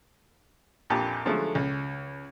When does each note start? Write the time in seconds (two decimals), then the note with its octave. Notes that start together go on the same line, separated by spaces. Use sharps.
0.90 A#1 F2 A#2 A#3 G4 A5
1.25 D3 F3 F#3 G#3 A3
1.55 C#2